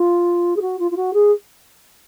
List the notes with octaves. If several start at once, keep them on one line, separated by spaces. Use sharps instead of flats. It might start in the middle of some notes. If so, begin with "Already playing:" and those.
Already playing: F4
G#4
F#4
F4
F4
F#4
G#4